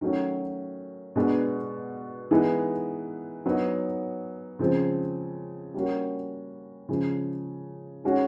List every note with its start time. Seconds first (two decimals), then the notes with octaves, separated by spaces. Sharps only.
0.01 D#3 F#3 A3 C#4 F#4
1.16 B2 G#3 B3 D4
2.31 E3 G#3 B3 D#4
3.46 F#3 B3 D#4
4.59 C#3 F3 G#3 C4
5.74 G3 A#3 C#4 F#4
6.89 C#3 F3 G#3
8.04 D#3 G#3 C#4 F#4